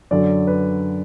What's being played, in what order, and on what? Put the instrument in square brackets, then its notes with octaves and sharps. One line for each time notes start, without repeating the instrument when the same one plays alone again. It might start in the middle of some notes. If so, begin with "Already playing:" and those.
[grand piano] F#2 D3 F#3 D5
B4